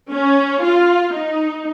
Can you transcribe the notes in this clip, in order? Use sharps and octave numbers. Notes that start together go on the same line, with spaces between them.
C#4
F4
D#4